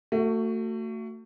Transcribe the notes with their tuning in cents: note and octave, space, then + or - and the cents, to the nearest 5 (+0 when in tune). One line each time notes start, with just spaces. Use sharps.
A3 +30 F#4 +0